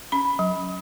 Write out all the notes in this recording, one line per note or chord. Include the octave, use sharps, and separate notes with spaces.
C#4 B5
F#3